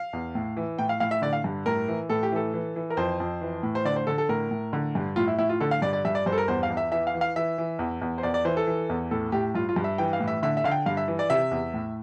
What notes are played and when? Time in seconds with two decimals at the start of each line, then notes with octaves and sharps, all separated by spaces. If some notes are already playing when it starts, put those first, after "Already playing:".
Already playing: F5
0.13 E2
0.35 A2
0.57 E3
0.78 A2 G5
0.89 F5
1.00 A2 F5
1.11 E5
1.22 D3 D5
1.33 F5
1.44 G2
1.66 A2 A#4
1.88 E3
2.09 A2 A4
2.23 G4
2.32 E3 A4
2.54 E3
2.76 E3
2.90 A#4
2.97 F2 C5
3.20 F2
3.41 E3
3.63 A2
3.75 C5
3.85 D3 D5
3.96 C5
4.07 D3 A4
4.18 A4
4.29 A2 A#4
4.51 A2
4.73 D3
4.95 G2
5.16 A2 F4
5.28 E4
5.38 A2 E4
5.49 F4
5.60 D3 A4
5.71 F5
5.82 G2 D5
5.93 D5
6.05 G2 E5
6.15 D5
6.26 G2 C5
6.32 A4
6.38 A#4
6.48 E2 C5
6.63 F5
6.70 E2
6.77 E5
6.92 E3 E5
7.07 F5
7.14 E3
7.21 F5
7.36 E3 E5
7.58 E3
7.79 E2
8.02 E2
8.18 C5
8.23 E2 D5
8.34 D5
8.45 E3 C5
8.57 A4
8.67 E3
8.89 E2
9.11 A2 A4
9.32 A2 G4
9.55 G2 F4
9.69 F4
9.76 G2
9.84 E5
9.98 E3 G5
10.13 F5
10.20 A2
10.28 E5
10.43 D3 E5
10.57 E5
10.64 D3 F5
10.71 G5
10.86 G2 F5
10.97 E5
11.08 E3
11.19 D5
11.30 C3 E5
11.51 E2
11.74 A2